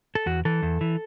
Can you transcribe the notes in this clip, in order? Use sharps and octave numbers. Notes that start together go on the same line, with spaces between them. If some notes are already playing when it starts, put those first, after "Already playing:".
A4
E2 F#4
E3 A4
E2
E3